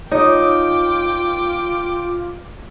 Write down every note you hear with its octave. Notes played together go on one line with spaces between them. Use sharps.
D#4 F4 C#5 G5 D6 D#6